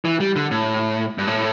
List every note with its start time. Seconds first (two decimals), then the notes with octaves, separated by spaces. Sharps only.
0.05 E3
0.20 G3
0.36 D3
0.51 A2
1.18 G2
1.27 A2